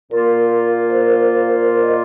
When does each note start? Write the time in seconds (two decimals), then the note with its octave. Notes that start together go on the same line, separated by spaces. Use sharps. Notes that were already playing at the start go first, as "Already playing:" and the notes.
0.11 A#2 A#3 F4 A#4
0.90 C5
1.01 A#4
1.83 D#5